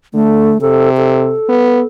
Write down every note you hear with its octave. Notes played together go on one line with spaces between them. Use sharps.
D3 A3
C3 A4
A4
B3